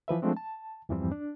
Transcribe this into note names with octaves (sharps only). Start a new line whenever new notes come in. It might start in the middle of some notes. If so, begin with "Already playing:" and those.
E3 F3 B4 E5
F3 G#3 A3 C4 D4
A5
E2 G2 E3 F3 G3 C4
D4